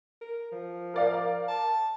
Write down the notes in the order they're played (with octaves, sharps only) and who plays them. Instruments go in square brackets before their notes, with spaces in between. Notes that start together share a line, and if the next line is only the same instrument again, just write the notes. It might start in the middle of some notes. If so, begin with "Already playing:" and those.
[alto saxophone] A#4
F3
[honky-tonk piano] A#4 D5 F5
[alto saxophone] A5